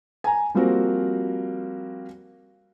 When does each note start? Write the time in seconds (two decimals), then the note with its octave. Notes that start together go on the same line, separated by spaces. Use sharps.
0.24 G#5 A#5
0.54 F3 G3 A#3 C4 F#4 A#4